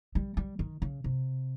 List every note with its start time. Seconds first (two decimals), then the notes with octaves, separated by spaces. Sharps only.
0.15 G3
0.37 G3
0.59 D#3
0.82 C#3
1.04 C3